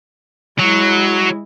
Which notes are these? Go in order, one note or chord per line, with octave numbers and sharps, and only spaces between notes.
F#3 G#3 E4